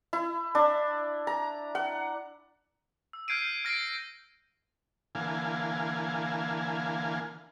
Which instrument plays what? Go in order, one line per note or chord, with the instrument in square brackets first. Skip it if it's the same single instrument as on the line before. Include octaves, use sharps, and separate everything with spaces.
[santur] E4
D4
A#5
F#5
[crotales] E6
F6 G6 G#6 C7 D7 D#7
F6 G#6 A#6 C7 D7
[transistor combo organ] D3 E3 A#3 F5 G#5